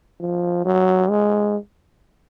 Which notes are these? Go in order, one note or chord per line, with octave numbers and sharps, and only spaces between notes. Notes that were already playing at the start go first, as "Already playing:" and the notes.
F3
F#3
G#3